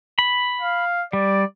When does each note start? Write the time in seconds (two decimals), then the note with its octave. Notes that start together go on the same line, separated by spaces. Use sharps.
0.19 B5
0.62 F5
1.13 G3 D5